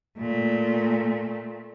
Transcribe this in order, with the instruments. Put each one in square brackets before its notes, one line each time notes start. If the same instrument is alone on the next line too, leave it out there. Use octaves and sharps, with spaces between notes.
[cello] A#2 A3